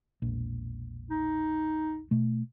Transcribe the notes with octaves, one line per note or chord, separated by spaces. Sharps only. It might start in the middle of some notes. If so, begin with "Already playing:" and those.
E1 A#1
D#4
B2 A3